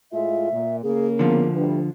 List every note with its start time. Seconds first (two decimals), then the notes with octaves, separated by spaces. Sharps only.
0.12 A2 G#3 F4 E5
0.52 A#2
0.83 C#3 A#3 G#4
1.19 D3 F3 B3
1.55 D2 G3 D4 B4